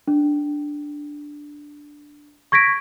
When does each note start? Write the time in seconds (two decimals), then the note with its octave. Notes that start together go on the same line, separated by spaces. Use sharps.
0.08 D4
2.52 C#6 G#6 A#6 B6 D7